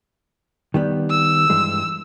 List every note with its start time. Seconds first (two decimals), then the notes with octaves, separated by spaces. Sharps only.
0.74 D#3 G3 B3
1.10 E6
1.50 G2 E3 G#3